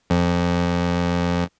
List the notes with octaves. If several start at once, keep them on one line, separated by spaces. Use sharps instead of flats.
F2